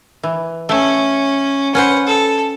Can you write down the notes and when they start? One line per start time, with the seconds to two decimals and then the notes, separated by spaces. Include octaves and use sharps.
0.23 E3
0.69 A3 C#4
1.75 C#4 B4 C5 F#5
2.07 A4